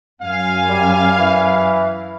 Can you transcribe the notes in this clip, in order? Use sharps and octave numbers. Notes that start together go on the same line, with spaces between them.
F#2 F5 G#5
G3
E3